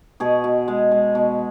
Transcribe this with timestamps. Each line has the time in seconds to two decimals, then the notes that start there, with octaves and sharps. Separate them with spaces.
0.20 B2 G#4
0.44 B2
0.68 G#3
0.91 G#3
1.15 B2